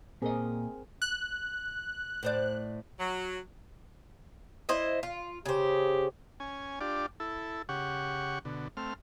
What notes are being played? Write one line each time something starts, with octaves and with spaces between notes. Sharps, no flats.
A#2 C4 G#4 A#4 D#5
F#6
A2 C5 D5
F#3
E4 C5 D#5
F4
C#3 G4 C5
C#4 G#5
D4 F4 G4 D5
E4 A4
C#3 G4 F#5 C#6
B2 D3
A3 C4 F6